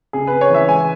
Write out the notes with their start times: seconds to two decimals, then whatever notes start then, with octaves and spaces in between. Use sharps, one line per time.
0.13 C#3 G#4
0.27 C#3 B4
0.41 C#5
0.50 E3 E5
0.68 G#3 G#5